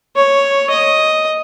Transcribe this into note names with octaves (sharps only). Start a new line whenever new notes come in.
C#5
D#5